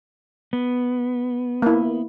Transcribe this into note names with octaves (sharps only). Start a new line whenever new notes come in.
B3
A#3 E4